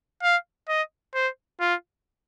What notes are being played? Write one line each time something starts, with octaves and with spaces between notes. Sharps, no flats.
F5
D#5
C5
F4